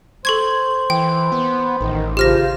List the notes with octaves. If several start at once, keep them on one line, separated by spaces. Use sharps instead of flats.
A4 C5 C#6 G#6
E3 G5
B3
A1 D#3
C#3 F4 G4 C5 F6 A#6